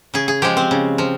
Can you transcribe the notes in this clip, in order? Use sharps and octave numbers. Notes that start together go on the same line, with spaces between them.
C#3 G#4
G#4
F3 G#3 G4
C4
C#3
F3